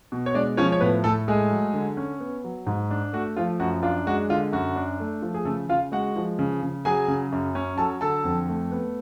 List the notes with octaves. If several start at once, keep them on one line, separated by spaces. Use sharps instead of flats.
B2
C#5
G#3 D4 D5
F3 C#4 C#5
C#5
A2 B3 B4
A2 A3 A4
G#3 A3 G#4
F#3
D3
C#4
B3
F#3
G#2
D4
A3 F#4
F3 F4
F#2 F#4
D4 F4
G#3 F#4
D3 F4
F#2 F#4
D4
A3
F3
G#4
C#3 A3 A4
C#3 F4 F5
G#3 F#4 F#5
F3
C#3
C#3
F#3 G#4 G#5
C#3
F#2
C#4
F#3 A4 A5
D3 A4 A5
F2
A3
B3